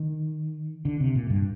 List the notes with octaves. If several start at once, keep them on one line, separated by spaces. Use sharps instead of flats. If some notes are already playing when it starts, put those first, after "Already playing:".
Already playing: D#3
D3
C3
A#2
G2